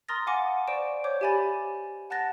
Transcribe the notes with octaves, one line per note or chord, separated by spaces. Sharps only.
A#5 C6 D#6 F6 A6 A#6
F5 F#5 G#5 D6 A#6 C#7
C5 D5 C#6 D7 E7
C5 C#5 D6 G6
G4 E5 G#5 B5 A6
F#5 A5 F#6 A6 A#6